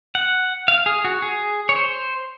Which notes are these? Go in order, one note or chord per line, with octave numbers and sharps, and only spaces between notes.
F#5
F5
G#4
F#4
G#4
C#5
C5